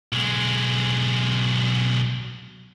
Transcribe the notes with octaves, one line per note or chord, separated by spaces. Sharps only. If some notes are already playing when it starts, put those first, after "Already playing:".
B1 G#3